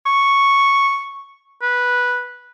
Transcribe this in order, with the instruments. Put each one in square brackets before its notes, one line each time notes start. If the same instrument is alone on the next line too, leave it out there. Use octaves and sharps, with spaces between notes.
[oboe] C#6
B4